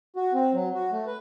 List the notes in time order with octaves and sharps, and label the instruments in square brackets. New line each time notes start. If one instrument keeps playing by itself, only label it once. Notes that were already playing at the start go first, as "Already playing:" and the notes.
[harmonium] F#4
C4
F#3
F#4
A3
B4